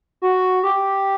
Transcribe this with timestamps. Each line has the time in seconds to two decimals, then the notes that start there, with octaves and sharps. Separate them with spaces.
0.22 F#4
0.63 G4